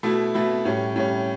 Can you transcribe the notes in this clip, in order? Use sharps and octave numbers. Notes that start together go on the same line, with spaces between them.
B2 A3 E4
B2 A3 E4
A2 G3 C#4
A2 G3 C#4